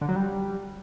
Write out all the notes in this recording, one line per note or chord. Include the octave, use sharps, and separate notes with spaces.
D3
F#3
G3